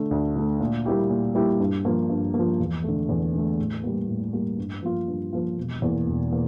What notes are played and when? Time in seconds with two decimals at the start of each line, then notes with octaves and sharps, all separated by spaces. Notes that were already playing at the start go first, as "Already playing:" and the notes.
Already playing: D3 A3
0.11 D2
0.36 D3 A3
0.60 A#2
0.86 G3 A#3 E4 G4
1.10 A#2
1.35 G3 A#3 E4 G4
1.60 G2
1.85 F3 A#3
2.10 G2
2.34 A#3
2.39 F3
2.60 E2
2.84 D3 A3
3.09 E2
3.34 D3 A3
3.58 A2
3.84 G3 A#3
4.08 A2
4.33 G3 A#3
4.58 G2
4.82 F3 A#3 F4
5.08 G2
5.33 F3 A#3 F4
5.58 E1
5.82 E2 E3 A#3
6.07 E1
6.32 E3 A#3